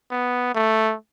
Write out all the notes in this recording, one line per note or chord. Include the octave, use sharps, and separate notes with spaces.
B3
A3